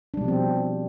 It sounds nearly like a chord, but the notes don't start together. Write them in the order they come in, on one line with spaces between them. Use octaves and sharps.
D4 G3 B2 F3 C4